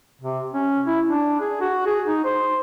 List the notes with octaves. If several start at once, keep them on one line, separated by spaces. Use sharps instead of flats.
C3
C#4
E4
D4
G#4
F#4
G#4
D#4
C5